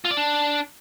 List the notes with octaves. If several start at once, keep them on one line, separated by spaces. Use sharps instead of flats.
F4
D5
D4